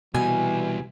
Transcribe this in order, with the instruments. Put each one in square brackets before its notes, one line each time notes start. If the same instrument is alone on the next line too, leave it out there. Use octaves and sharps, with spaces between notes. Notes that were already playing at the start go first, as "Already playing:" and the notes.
[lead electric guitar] C2 G3 [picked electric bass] B2 [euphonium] E3 [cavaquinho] G#5